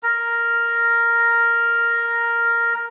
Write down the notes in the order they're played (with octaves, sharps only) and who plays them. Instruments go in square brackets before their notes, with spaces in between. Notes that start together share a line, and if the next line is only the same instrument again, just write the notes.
[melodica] A#4 A#5